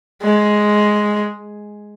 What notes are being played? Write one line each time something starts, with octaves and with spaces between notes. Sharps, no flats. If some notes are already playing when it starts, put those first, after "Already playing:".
G#3